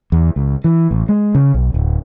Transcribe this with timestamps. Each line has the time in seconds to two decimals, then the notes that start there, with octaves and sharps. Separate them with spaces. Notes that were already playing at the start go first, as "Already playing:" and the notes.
0.12 E2
0.36 C#2
0.64 E3
0.91 A1
1.09 G#3
1.35 C#3
1.54 B1
1.74 D1